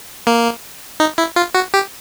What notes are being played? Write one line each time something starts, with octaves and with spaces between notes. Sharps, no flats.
A#3
D#4
E4
F4
F#4
G4